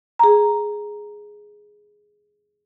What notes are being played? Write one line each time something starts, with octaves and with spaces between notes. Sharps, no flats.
G#4 A#5